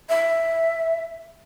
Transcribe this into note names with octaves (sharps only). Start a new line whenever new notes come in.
E5